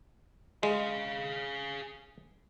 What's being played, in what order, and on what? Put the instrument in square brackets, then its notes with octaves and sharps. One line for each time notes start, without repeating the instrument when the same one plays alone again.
[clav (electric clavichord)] G#3 [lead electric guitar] G#4 F5